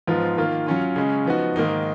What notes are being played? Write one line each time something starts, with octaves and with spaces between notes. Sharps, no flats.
G#2 F3 B3 F4
D#3 A#3 F4
F#3 C#4 F4
C#3 G#3 C#4
F3 B3 D#4 F#4
G#2 D#3 A#3 D#4